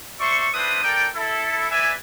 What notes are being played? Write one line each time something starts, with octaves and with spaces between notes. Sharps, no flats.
C5 D5 E5 C#6
C4 D4 E4 B4 C5 D#6
A4 A#4 D5 G5
E4 A4
B4 D5 E5 G#5